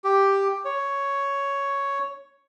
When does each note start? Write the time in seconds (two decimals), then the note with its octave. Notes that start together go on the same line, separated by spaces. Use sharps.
0.04 G4
0.65 C#5